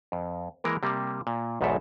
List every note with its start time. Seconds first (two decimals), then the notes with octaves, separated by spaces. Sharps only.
0.12 F2
0.64 E3 G#3 A#3 A#4
0.83 C3 G3 A#3
1.27 A#2
1.61 B1 E2 G#2 B2 A4 E5